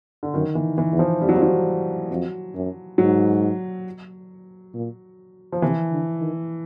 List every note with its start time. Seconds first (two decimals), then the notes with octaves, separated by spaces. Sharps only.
0.23 D3
0.34 F#2 D#3
0.55 E3
0.78 E3
0.92 E2
0.99 F3
1.21 F2 G3
1.29 F#3
1.36 F3
1.43 F#3
2.10 F2
2.55 F#2
2.98 G#2 F#3
4.74 A#2
5.52 F3
5.62 C3 E3
5.91 D3
6.21 D#3